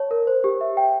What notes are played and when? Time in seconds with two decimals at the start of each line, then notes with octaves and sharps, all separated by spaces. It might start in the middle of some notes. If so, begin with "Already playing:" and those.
Already playing: C#5 A5
0.11 A#4
0.27 C5
0.44 G4
0.61 E5
0.77 G5